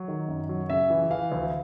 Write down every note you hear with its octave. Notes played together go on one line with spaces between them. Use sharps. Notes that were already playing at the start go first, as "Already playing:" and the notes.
Already playing: F#3
D#3
F#2
F#3
C#3 E5
E3
E3 F5
D2